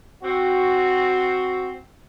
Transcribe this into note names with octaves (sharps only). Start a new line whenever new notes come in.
C4 F#4